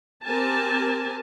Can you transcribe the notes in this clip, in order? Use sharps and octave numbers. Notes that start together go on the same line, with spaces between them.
C4 G4 A#4 G#5 A5